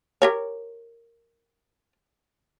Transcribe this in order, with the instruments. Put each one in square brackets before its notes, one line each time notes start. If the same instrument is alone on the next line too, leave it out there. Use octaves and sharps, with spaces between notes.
[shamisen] G4 A#4 C#5